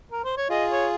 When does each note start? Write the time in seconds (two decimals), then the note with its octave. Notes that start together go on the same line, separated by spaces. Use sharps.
0.12 A#4
0.25 C5
0.37 C#5
0.49 F4 G#4 D#5
0.71 C#5